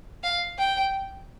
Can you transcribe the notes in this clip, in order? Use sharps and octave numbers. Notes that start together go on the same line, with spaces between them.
F5
G5